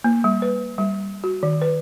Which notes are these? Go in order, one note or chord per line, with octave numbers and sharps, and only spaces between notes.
A#3
G3
B4
G3
F#4
D#3
B4